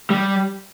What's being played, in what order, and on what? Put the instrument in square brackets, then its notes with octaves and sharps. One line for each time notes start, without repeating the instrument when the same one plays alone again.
[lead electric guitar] G3